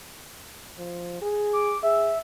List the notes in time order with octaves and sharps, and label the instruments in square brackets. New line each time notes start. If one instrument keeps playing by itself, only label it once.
[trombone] F3
G#4
[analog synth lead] D6
[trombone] G#4 [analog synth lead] E5